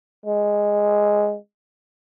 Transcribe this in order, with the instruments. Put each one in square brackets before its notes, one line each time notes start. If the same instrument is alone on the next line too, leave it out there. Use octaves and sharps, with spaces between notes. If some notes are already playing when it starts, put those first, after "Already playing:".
[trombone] G#3